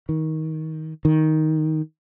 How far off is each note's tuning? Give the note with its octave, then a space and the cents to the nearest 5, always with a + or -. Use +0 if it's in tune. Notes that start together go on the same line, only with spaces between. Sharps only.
D#3 +20
D#3 +5